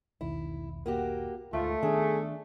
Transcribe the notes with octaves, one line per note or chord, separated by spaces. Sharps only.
E1 B1 D#3 E4
A#3 F#4 G4
D2 G#2 A3 F4
D#3 B3 D4 G#4